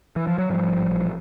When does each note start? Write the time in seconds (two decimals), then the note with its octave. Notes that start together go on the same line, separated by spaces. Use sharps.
0.16 E3
0.27 F3
0.38 F#3
0.50 G#2 F3 G3
0.70 A1
0.90 A#1